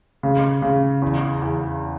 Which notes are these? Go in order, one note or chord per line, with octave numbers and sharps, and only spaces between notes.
C#3
C#3
E2
E2